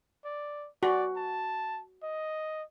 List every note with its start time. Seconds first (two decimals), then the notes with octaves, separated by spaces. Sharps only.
0.25 D5
0.83 F#4 D5
1.16 A5
2.03 D#5